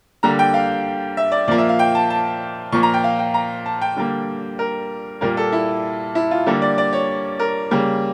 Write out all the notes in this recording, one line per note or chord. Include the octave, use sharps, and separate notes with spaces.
D3 G3 A#3 A#5
G5
F5
E5
D5
A#2 F3 A#3 D5
E5
F5
G5
A5
A5
A#2 F3 A#3 C#6
A#5
G5
F5
G5
A#5
A5
G5
D3 G3 A#3
A#4
A#2 G3 A#3 A#4
A4
E4
E4
F4
D3 G3 A#3 A4
D5
D5
C#5
A#4
C#3 G3 A#3